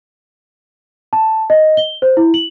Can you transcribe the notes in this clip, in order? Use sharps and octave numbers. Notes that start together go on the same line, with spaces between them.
A5
D#5
G7
C5
E4
F#7